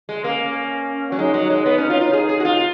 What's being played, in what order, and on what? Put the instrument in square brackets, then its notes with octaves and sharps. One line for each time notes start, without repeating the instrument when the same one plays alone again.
[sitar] G#3
[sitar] A#3 [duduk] C#4
[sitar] F#3
[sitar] G#3 [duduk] D#4
[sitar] F#3
G#3
B3
C#4
F4
F4
[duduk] D#4 [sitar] G#4
[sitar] G#4
F#4
F4